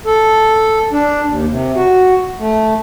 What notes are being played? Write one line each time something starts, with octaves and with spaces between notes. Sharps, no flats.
A4
D4
D#2
C3
F#4
A3